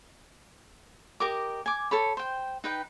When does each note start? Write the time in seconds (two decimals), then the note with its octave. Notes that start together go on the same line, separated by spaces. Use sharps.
1.20 G4 A#4 D#5 D6
1.66 G#5 D6
1.91 A4 C#5 B5
2.17 C5 G5
2.64 D#4 B4 G5